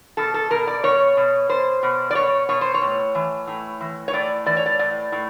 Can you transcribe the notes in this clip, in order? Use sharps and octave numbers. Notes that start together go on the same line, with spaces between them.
B2 A4
A4
B2 A#4
D5
B2 C#5
B2
B2 C5
B2
D5
B2 C#5
B2 C#5
C5
C#5
A2
E3
A2
E3
C#5
A2 D5
E3 D5
C#5
D5
A2 D5
A2